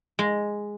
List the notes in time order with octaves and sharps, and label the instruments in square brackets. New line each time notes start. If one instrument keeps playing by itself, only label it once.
[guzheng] G#3